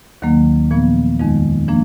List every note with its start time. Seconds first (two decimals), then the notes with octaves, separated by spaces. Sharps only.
0.22 D#2 D#3 F#3 A#3
0.71 A#2 F3 B3
1.19 F2 D#3 G#3 D#4
1.68 F3 A#3 D4